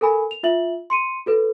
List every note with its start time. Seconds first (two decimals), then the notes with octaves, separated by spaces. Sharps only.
0.01 A4 A#4 G#5 B5
0.31 F7
0.43 F4 E5 F#7
0.90 C6 C#7 D#7
1.26 F#4 A4 B4